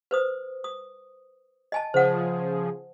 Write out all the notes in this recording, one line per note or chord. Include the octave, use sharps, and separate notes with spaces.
B4 C5 D#6
D#6
D#5 G#5 A5
C#3 F3 G#4 C5 F#5